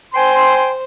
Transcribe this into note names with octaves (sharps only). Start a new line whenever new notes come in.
C5 G5 G#5 C6